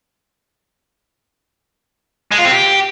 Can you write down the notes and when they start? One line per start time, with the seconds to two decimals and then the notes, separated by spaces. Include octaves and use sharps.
2.32 G#3
2.38 F4
2.45 C4
2.52 G4